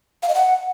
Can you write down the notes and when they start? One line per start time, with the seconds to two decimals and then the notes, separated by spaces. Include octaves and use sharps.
0.23 F5
0.29 D#5
0.35 F#5